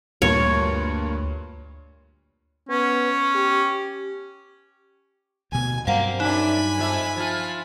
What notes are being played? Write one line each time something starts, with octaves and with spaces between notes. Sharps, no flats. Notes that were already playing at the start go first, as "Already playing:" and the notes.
D2 G2 A#2 C#5
B3 C#4
G4
D2 B2 G#5
G2 F#3 G3 A#3 C4 F5 F#5
F#2 D4 D#4 G#5 B5
F2 F3 E5
F3 F4